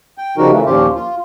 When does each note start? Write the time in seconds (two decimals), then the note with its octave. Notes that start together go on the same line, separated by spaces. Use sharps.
0.18 G5
0.38 C#3 F3 G3 D#4 F#4 A#4
0.51 C#3 E3 A3
0.66 D#2 A#2 F3 C#4 F4 G4
0.95 F4